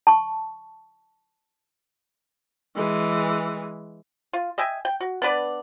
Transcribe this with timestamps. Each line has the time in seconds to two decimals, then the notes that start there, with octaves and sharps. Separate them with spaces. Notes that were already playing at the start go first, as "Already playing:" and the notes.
0.07 A5 C#6
2.75 E3 G#3
4.33 F4
4.58 D#5 E5 G5 G#5
4.85 G5
5.00 F#4
5.22 B3 D4 B4 D5